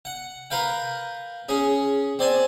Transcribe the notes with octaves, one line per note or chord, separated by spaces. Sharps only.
F#5
A#4 B4 F5 G5
C#4 G#4
C4 D5 G#5 A5